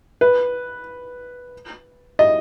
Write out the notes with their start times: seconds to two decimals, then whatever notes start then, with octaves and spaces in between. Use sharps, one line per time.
0.21 B4
2.19 D#5